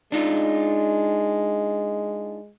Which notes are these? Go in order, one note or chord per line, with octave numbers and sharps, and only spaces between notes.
G#3 D4 D#4 F4